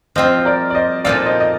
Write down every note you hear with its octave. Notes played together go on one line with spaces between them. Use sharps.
F3 C4 F4 C5 D#5
C5
A#4 D5
D5
C5 D#5
A#2 F3 A#3 D#4 A4 D5 F5
C5 D#5
D#5